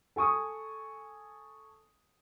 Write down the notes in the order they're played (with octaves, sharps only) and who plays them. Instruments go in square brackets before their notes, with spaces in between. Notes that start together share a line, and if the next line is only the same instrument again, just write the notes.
[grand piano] A4 G#5 C#6 D#6